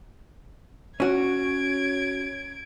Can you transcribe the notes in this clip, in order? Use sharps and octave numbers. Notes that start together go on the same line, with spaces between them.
C#4 F#4 G#6 D7